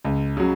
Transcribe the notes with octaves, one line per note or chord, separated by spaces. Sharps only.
C#2
C#3 F#3